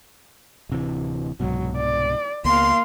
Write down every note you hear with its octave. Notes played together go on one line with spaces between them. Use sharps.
D1 C3 E3
C2 G#2 B2 F#3
D5
C#2 A#3 B3 F5 C6